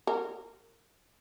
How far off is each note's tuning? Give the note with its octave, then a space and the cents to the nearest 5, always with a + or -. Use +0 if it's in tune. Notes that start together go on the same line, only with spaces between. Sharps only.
A#4 -25